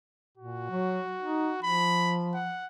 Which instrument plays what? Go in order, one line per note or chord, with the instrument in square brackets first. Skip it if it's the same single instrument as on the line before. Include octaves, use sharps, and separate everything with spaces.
[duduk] A#2 [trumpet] F#4
[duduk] F#3
D#4
[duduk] F3 [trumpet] B5
[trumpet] F#5